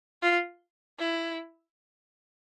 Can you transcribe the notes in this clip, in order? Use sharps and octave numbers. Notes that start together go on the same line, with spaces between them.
F4
E4